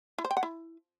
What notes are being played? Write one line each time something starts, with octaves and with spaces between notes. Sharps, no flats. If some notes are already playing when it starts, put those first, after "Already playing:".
E4
C5
G5
F#5
E4